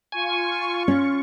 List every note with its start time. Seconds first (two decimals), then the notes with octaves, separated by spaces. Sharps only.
0.12 F4 G#5 C#6
0.88 C#4